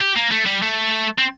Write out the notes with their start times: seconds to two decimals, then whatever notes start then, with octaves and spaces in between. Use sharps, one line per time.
0.01 G4
0.16 A#3
0.32 A3
0.46 G3
0.63 A3
1.18 C4